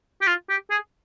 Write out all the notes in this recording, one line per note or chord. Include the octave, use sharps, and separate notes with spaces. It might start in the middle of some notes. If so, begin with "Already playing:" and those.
G4
F4
G4
G#4